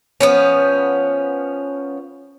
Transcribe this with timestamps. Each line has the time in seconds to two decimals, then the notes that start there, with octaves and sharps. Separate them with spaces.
0.21 F3 B3 C#4